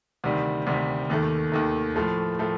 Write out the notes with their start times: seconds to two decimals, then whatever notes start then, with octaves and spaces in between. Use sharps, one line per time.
0.24 D2 C3 D#3 G3
0.67 D2 C3 D#3 G3
1.10 D#2 D#3 A3
1.52 D#2 D#3 A3
1.96 A2 F3 A3
2.39 A2 F3 A3